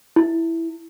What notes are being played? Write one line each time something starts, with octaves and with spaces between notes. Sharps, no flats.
E4